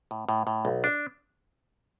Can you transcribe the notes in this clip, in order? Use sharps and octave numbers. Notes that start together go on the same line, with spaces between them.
A2
A2
A2
B1
D4